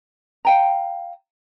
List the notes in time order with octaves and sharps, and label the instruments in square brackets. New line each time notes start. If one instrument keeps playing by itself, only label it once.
[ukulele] F5 G5 A#5